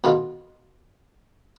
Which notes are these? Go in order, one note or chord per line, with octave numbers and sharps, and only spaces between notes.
B2 D#3 F4